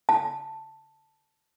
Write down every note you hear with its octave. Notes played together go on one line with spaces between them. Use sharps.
A5